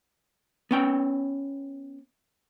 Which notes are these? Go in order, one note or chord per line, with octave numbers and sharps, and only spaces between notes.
B3 C#4 G5